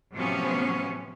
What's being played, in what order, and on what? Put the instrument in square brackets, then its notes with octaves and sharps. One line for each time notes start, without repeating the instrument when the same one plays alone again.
[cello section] A2 C3 F3 F#3 B3 C#4